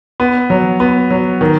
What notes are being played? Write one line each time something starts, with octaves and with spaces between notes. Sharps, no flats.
B3
F#3
B3
F#3
D#3